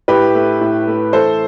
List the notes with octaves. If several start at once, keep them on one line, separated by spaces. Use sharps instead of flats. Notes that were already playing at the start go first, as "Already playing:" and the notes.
A2 G4 B4
A3
A2
A3
E3 A4 C5